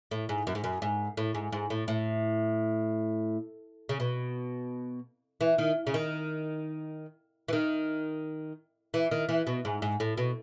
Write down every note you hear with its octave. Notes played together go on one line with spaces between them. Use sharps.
A2
G#2
F#2
G#2
F#2
G#2
A2
G#2
G#2
A2
A2
C#3
B2
E3
D#3
C#3
D#3
E3
D#3
E3
D#3
E3
B2
G#2
G#2
A2
B2